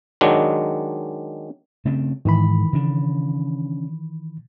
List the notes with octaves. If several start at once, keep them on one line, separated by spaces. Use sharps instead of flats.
D#3 F#3 G#3 D4
C#3 A3 C4
G#2 D#3 E3 B5
C#3 D4